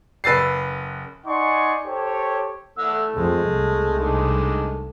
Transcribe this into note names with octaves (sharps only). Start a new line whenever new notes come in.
F#1 B4 E6 A6 C7
D#4 D5 F#5 G#5 C6 C#6
G4 A4 C5 C#5
A3 E4 F#5 E6
F2 G#3
C2
D#3 G#3 D4